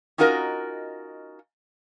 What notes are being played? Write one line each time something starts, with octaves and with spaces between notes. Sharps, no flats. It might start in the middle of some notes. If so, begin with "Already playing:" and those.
C#4 D#4 F4 F#4 A#4 D#5